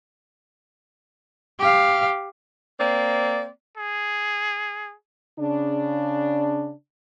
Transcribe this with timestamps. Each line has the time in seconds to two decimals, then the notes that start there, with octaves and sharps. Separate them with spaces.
1.59 G4 F5
2.80 A#3 C4 D5
3.78 G#4
5.39 C#3 D4